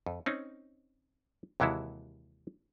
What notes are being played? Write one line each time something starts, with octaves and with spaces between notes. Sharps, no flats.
F2
C4 C#4 D#4
D#2 C3 E3 G#3 E4 F#4